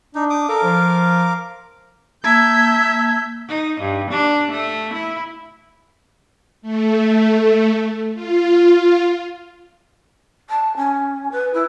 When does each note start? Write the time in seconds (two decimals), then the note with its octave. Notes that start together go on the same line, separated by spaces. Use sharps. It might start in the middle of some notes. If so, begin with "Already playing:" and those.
0.15 D4 D#4
0.30 D6 D#6
0.49 A4 A#4 F5 D6
0.63 F3
2.24 A#3 E5 A5 G6 G#6
3.48 D#4
3.81 G2
4.11 D4
4.51 A3
4.94 E4
6.62 A3
8.14 F4
10.49 A5
10.76 C#4
11.31 B4
11.53 E4